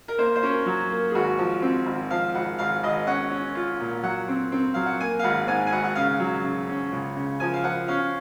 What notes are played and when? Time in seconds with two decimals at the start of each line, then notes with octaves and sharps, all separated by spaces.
0.08 A#4
0.18 A#3 C5
0.35 C5
0.43 C#4 A#4
0.66 F#3
0.90 A#3
1.10 G#4
1.15 G#1 F#4
1.39 F3
1.62 C4
1.86 G#1
2.10 F3 F5
2.35 G#1 F#5
2.59 G#1 F5
2.83 G#1 D#5
3.07 C#4 F#5
3.31 C#4
3.55 F4
3.80 A#2
4.03 F#3 F#5
4.28 C4
4.52 C4
4.74 F#3 F5
4.86 F#5
5.00 A#3 G#5
5.19 F5
5.23 G#1 F#5
5.47 G#2 G#5
5.67 G#5
5.72 G#1 F#5
5.84 F#5
5.96 C#3 F5
6.20 F#3
6.44 C#3
6.69 C#4
6.92 C#2
7.16 C#3
7.40 F3 G#5
7.53 F5
7.64 F3 F#5
7.88 C#4 F5